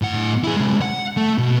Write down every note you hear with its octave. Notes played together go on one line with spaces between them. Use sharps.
A2 F#5
E4 G#4
C3 G#3
F#5
A3
B2